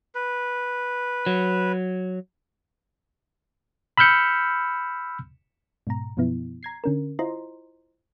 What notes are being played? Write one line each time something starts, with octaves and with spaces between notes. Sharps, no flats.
B4
F#3
B5 E6 F6 G6 C#7
G#2 B2 A#5
F#2 B2 F3 B3 E4
A#5 G#6 C7
D3 C#4 A#4
E4 F4 C5 D#5 A#5 C6